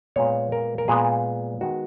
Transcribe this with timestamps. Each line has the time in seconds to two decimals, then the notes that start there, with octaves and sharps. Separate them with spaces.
0.16 A#2 G#3 B3 C#5
0.52 A#4
0.78 A#4
0.88 A#2 G#3 B3 G#4
1.61 D#3 G#3 B3 F#4